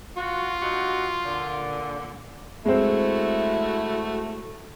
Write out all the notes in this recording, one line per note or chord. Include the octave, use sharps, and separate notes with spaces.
F4 F#4
G2 D#4 F#4
A#2 D3
G#3 A3 C4 E4 F#4